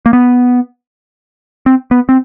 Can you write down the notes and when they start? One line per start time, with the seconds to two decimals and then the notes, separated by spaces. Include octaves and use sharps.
0.06 A#3
0.13 B3
1.66 C4
1.91 B3
2.09 C4